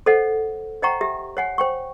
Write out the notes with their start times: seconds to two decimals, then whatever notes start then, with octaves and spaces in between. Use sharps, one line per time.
0.06 A4 C5 D#5 F#5
0.82 C5 D#5 F#5 G5 A#5 C#6
1.01 G4 E5
1.37 C#5 F#5 G#5
1.58 C5 G5 C#6